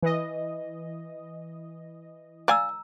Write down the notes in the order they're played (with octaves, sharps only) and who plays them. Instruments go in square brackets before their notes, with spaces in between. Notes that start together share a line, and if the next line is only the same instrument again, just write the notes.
[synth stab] E3 D#5
[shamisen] D5 F5 G#5 [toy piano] A#5 E6